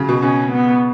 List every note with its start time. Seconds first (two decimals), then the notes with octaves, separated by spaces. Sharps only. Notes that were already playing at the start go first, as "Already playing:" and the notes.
Already playing: C#3 F#3
0.09 B2
0.22 B2 C#4
0.52 B3